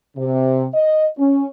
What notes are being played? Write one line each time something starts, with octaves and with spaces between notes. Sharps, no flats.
C3
D#5
C#4